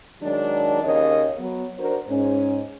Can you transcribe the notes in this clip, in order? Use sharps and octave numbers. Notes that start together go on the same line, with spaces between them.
D#3 F#3 G#3 D4
D#2 C#3 A#4 C#5 D#5
F#3 B3
D4 F#4 A#4 C5
G#2 C#4